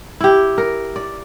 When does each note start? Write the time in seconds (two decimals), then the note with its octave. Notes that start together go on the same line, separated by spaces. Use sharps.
0.20 E4 G4
0.58 A#4
0.96 D5